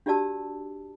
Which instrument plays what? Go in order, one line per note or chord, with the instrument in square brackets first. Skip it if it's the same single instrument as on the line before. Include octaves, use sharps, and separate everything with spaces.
[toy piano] D4 F#4 G4 D5 A5 E6